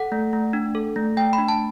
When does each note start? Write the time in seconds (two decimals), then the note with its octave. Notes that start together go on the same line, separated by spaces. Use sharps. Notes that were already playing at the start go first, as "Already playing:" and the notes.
Already playing: A4 F#5
0.12 A3
0.33 A3
0.53 D4
0.75 A4
0.96 A3
1.17 A3 G5
1.33 B5
1.38 D4
1.48 A5